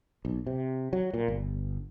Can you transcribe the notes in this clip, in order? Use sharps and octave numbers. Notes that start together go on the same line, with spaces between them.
B1
C3
F#3
A#2
G1